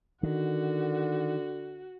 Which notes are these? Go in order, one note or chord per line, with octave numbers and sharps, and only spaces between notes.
D3 D#3 F#4